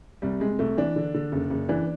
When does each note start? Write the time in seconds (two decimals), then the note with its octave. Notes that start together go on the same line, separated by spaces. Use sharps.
0.22 C2 G3
0.40 C3 G#3
0.59 C2 A3
0.77 E3 D4
0.96 D3
1.14 D3
1.32 F#1
1.50 F#1
1.69 E3 D4